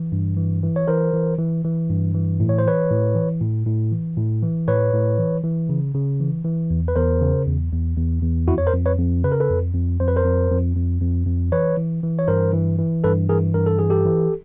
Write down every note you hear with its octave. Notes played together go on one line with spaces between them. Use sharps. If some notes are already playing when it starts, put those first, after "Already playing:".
Already playing: E3
G2
E3
E3
C#5
E3 A#4 C5
E3
E3
E3
G2
E3
A2
C#5
C5
E3 B4 C#5
A2
E3
A2
A2
E3
A2
E3
A2 B4 C#5
A2
E3
E3
C#3
C#3
E3
E3
E2
B4
E2 A#4 C5
C#3
E2
E2
E2
E2
F2 E4 F#4
C#5
A#4 C5
F2
B4 C#5
F2
C#3 B4
A#4
A4 B4
F2
F2
F2 C5
B4
A#4 C5
F2
F2
F2
F2
F2
E3 B4 C#5
E3
E3
C#5
G2 A#4 C5
E3
E3
G2 A4 B4
E3 G#4 A#4
G2 A#4
A4
E3 G#4
G4 A4
E3